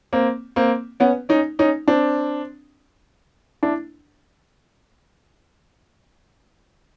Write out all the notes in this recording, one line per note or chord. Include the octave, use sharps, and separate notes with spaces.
A#3 C4
A#3 C4
B3 C#4
C#4 D#4
C#4 D#4
C4 D4
D4 E4